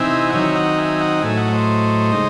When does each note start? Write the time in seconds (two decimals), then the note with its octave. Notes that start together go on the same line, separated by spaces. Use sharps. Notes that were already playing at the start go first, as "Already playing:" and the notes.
Already playing: C3 E3 C4 D#4 E5 G#5
0.30 F#5
0.33 D#3 F#3 C4 D#4 C#5 E5
0.55 D#5 F#5
0.78 E5 G#5
1.01 D#5 F#5
1.22 A2 F#3 A3 E5 G#5
1.37 D#5 F#5
1.53 C5 D#5
2.12 C#3 G#3 D#4